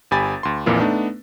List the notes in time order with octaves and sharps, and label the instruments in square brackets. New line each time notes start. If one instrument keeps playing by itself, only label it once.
[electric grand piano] G1 G4 G#5 B5 A6
D2 C6
A#1 F2 A#2 E3 A#3
A3 B3 D4 D#4